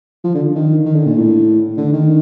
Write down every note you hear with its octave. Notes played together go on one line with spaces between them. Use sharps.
F3
D3
D#3
D#3
D3
A#2
A2
D3
D#3